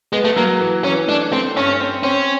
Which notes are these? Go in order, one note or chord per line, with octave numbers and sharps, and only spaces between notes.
G#3 B3
A3
F#3 A#3
E3
E3 C#4
A3 D4
A3 C4
G2 C#4
C4
C4 C#4